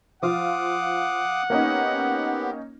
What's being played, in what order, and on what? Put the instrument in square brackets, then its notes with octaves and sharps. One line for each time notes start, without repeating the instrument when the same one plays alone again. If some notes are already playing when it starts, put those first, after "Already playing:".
[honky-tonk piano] F3 F4 [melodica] F5 D6 D#6 [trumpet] F#5
[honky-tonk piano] A#3 C#4 D#4 [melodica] B3 G4